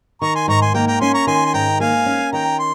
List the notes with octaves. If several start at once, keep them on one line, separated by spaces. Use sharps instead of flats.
D#3 A#5 C#6
G#5 C6
G#2 A#5 C#6
G#5 C6
A#3 G5 A#5
G5 A#5
C#4 G#5 C6
A#5 C#6
D#3 G#5 C6
G#5
G#2 G5 A#5
A#3 F5 G#5
C#4
D#3 G5 A#5
C6